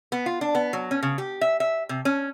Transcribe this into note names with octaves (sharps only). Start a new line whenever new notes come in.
B3
F4
D4
B3
F#3
C#4
C#3
G4
E5
E5
C3
C#4